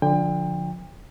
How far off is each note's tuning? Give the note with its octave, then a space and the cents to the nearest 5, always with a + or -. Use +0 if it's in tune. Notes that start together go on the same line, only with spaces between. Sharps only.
D3 +0 F3 +25 G5 +30